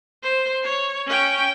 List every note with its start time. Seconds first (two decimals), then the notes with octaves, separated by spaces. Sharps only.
0.23 C5
0.64 C#5
1.07 C#4 G5